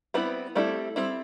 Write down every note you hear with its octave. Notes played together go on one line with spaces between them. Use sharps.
G3 B3 C4 E4 B4
G3 A3 C4 E4 A4
G3 C4 E4